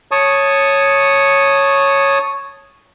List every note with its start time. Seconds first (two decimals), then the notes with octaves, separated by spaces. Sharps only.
0.11 C#5 A5 C#6 D#6